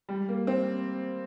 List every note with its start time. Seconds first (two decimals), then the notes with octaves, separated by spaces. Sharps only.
0.09 G3
0.28 A#3
0.47 C4